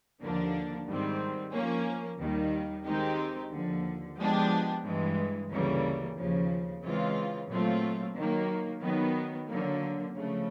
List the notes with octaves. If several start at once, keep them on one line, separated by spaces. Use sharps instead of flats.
D#2 D3 F3 A#3 D4
G#2 D#3 G3 C4
F3 A#3 C#4
D#2 D#3 G3
D#3 G#3 C4 D#4 G4
D#2 D3 F3
F3 G#3 B3 D4 G4
G2 E3 G#3
D2 C#3 E3 G3 A#3
D#2 C#3 F3
C#3 E3 G#3 C4 F4
A#2 F#3 A3 C4 F4
D#3 F#3 A#3
D#3 F#3 B3
D3 F#3 A#3
C#3 F3 A3